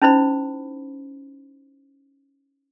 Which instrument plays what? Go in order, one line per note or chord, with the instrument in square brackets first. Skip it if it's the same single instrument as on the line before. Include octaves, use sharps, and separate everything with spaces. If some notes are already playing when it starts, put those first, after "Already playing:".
[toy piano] C#4 D#4 E4 C5 B5